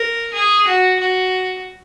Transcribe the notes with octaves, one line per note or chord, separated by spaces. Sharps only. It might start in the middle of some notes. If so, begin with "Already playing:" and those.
Already playing: A#4
G#4
F#4
F#4